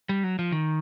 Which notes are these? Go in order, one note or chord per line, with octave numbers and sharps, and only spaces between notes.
G3
F#3
F3
D#3